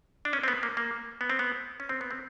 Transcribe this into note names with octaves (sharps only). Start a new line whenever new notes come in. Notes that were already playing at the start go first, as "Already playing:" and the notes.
D4
C#4
C4
B3
A#3
A#3
B3
C4
B3
C#4
C4
B3
C4